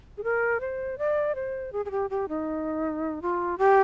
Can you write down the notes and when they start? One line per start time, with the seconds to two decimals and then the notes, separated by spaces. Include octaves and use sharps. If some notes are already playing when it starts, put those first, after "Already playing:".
0.17 G#4
0.24 A#4
0.60 C5
0.98 D5
1.35 C5
1.72 G#4
1.85 G#4
1.91 G4
2.10 G4
2.29 D#4
3.22 F4
3.58 G4